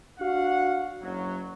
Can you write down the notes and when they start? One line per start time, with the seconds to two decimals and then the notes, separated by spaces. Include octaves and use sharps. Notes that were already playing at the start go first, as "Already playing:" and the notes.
0.20 D4 F#4 F5 F#5
1.01 F#1 F#3